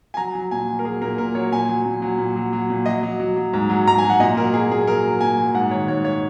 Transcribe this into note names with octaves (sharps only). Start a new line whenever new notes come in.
G#5
F#3 A#5
F#3
A#2 G#5
F#3
A#4
F#3 G#4
A#2 A#4
A#2 A#4
F#3 C#5
A#2 G#5
F#3
A#2
F#3
A#2
F#3
F#3
A#2
F#3 D#5
F#3
F#3
F#3
G#2
F#3
G#2 A#5
G#5
F#3
F#5
A#2 D#5
F#3 A#4
F#3 G#4
A#2 G#4
G#4
F#3 A#4
F#3
A#2 G#5
F#3
G#2 F#5
D#3 C#5
G#2 C#5
C#5